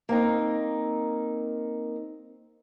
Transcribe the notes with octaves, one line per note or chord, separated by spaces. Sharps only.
A#3 C4 D#4